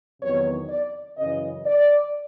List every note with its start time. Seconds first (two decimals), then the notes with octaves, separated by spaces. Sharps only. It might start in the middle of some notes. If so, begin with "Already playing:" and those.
0.21 E2 C3 D#3 F#3 B3 C#5
0.69 D5
1.18 F#2 C#3 E3 D#5
1.66 D5